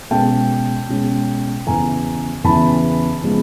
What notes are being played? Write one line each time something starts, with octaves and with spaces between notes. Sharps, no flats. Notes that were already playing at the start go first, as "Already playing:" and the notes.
B2 G#3 C#4 G5 A5
B2 G#3 C#4
E2 C#3 E3 G#5 A#5
E2 C#3 E3 A5 B5
C#3 F3 G#3 B3